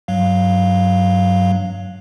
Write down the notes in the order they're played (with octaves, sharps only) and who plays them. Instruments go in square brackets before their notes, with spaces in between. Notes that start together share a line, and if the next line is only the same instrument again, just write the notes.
[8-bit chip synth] G2 F#3 F5